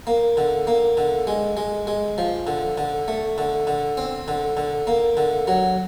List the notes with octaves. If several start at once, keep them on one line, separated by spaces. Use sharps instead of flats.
A#3
D3
A#3
D3
G#3
G#3
G#3
F3
D3
D3
A3
D3
D3
C4
D3
D3
A#3
D3
F#3